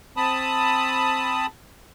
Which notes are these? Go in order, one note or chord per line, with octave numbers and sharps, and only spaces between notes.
C4 A5 B5 D#6